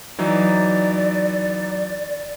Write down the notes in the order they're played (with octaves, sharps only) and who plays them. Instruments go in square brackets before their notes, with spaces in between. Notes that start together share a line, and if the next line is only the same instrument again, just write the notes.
[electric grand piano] E3 F#3 D#4 [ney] D5